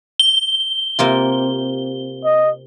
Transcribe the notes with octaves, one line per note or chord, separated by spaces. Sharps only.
G7
C3 A#3 F4
D#5